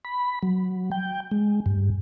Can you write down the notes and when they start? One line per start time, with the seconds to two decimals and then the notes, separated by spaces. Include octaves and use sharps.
0.05 B5
0.43 F#3
0.91 G5
1.31 G#3
1.66 G2